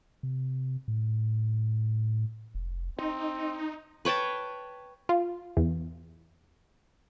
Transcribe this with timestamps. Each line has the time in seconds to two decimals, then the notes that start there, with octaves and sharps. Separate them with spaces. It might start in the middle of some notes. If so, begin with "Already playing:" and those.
0.23 C3
0.88 A2
2.55 F1
2.99 C4 D#4
4.05 B4 C#5 G5 A5
5.09 F4
5.57 E2